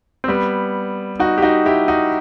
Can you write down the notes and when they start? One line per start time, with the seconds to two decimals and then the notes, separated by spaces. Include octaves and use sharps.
0.24 C4
0.28 G3 B3
1.19 D#4 F#4
1.38 G4
1.42 D#4 F#4
1.66 E4 G4
1.88 D#4 F#4